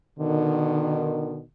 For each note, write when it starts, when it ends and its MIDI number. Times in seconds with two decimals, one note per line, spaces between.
0.20 1.41 47
0.20 1.41 50
0.20 1.41 51